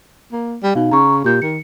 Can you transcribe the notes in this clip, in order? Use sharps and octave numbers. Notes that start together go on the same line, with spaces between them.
A#3
G3
B2 D#4 F5
C#3 A#5 C#6
A#2 G4 G6
D#3 C#7